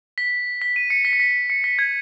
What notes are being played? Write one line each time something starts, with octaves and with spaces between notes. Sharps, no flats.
B6
B6
D#7
C#7
B6
C#7
B6
C#7
B6
G#6